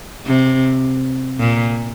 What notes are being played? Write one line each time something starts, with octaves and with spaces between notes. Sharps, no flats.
C3
A#2